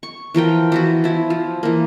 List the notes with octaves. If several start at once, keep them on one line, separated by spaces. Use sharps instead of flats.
C#6
E3 F3 A#4 G5
E3 B3 F#4
F3 E4
F3
E3 A#3